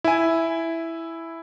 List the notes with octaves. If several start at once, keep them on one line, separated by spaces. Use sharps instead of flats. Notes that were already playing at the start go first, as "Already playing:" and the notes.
E4 G#5